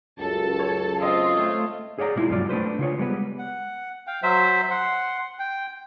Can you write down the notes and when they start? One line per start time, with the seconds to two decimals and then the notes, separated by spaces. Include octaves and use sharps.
0.19 C#2 F#2 A4 A5
0.59 C#5
1.00 C4 F4 A4 D#5
1.37 A3
1.98 G#4 C#5 D5 E5 A#5
2.15 B2 G3 G#3 E4 F4
2.28 C#2 G2 B2 F#3 F4 D5
2.49 A3 D4 B4 C5
2.79 C#3 F4 C#5
2.98 G3 G#3 B3 B4
3.39 F#5
4.07 F5 G5
4.23 F#3 C5 E5
4.71 F#5 C6
5.39 G5